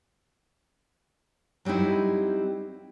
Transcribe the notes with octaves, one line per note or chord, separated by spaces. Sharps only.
F#3 G3 C4 D#4 E4